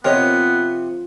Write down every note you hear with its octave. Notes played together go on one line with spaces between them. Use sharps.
C3 F3 B3 A#4 C#5 D#5